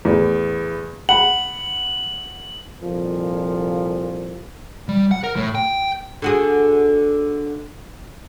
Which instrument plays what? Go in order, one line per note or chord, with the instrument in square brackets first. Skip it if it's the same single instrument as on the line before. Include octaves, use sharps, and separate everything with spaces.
[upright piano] E2 A2
[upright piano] F#5 B5 [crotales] F#7
[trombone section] C2 F2 A#2 F3
[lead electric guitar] G3
F#5
A#4
A2
G5
[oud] D3 F#4 G#4